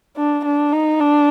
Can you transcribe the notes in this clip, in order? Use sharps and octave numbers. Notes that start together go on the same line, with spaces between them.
D4
D4
D#4
D4